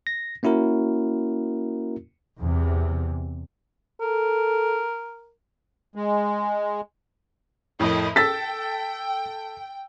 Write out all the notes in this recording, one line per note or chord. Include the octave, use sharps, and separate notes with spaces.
A#6
A#3 C#4 E4 F#4 A#4
E2 C3
A4 A#4
G#3
F2 A2 E4 A#4 D#5
A4 G5 E6 A6 B6